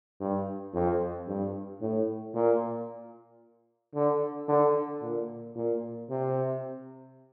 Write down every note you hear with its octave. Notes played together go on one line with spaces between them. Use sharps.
G2
F2
G2
A2
A#2
D3
D3
A#2
A#2
C3